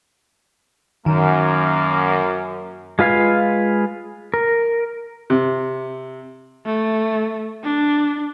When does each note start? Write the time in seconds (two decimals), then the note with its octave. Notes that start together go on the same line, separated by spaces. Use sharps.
1.06 F#2 D#3 A#3
2.99 G#3 F4 B4 F5 G#5
4.34 A#4
5.30 C3
6.66 A3
7.64 D4